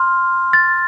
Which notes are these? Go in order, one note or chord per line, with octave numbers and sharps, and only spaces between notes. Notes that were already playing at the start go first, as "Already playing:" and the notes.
Already playing: C6 F6
A6